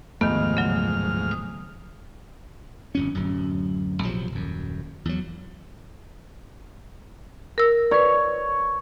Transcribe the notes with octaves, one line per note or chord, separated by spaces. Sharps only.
D1 F2 G#2 D#3 A3 B3 F6
C#3 F#3
D#6
G1 F2 C#4
D1 F#2
A#1 C3 F3 F#3
D#1 F#2
E2 F#3
A#4 E6
B4 C#5 D5